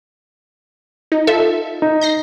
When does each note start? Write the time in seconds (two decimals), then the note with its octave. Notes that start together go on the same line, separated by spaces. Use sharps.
1.12 D#4
1.27 F4 A4 E5
1.82 D#4
2.01 G6 A#6 C7